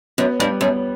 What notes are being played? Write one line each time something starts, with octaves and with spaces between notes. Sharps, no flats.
F#2 B3
G2 G3
F#2 B3